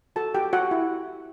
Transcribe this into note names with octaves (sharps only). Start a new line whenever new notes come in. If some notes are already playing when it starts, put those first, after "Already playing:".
F#4 A4 A5
F#4 G4 G5
F#4 C#5 F#5
E4